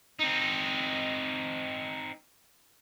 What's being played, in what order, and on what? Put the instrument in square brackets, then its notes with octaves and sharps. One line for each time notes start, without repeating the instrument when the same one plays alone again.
[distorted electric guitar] C4 D#4